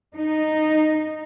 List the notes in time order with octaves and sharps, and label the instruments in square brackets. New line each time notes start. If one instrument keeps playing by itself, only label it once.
[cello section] D#4